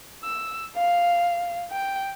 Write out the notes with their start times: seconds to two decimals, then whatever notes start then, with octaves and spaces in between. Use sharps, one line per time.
0.24 E6
0.76 F5
1.72 G5